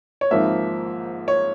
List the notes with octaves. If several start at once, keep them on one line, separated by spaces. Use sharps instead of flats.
C#5
G#1 G#2 F3 A#3 E5
C#5